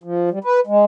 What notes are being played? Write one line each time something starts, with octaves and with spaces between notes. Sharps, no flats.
F3
G3
B4
G#3